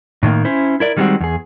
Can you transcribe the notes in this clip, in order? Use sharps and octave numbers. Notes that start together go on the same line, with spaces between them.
A2 D#3 G#3 A#3
C#4 E4 C5
E4 A#4 D5
D#3 G3 G#3 A#3 C4 F#4
E2 G#4